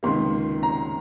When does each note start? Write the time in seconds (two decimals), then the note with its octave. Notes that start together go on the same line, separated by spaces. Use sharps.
0.03 C#2 C3 D#3 A#3 C6
0.63 A#5